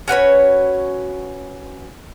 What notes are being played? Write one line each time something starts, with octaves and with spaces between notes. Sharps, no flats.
C#4 F#4 B4 C#5